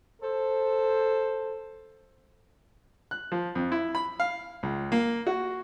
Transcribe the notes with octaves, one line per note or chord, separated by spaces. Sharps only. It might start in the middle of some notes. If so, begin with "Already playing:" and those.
A4 C5
F#6
F3
F2
E4
B5
F5
C#2
A#3
F#4